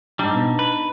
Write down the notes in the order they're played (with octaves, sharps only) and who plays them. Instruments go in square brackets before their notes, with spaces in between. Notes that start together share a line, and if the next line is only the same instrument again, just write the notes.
[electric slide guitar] G#2 G3 [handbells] D4 D#4
[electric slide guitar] B2
B4